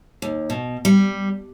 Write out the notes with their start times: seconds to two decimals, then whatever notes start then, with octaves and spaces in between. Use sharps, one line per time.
0.22 D#2
0.50 B2
0.85 G3